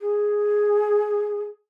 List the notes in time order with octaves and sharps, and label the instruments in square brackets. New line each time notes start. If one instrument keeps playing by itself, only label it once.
[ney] G#4